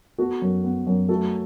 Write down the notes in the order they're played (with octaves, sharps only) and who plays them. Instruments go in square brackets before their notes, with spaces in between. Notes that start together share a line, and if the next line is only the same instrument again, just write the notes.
[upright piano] B3 [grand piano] F#4 A4
[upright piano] F#2
B3
F#2
[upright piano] A3 [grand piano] F#4 A4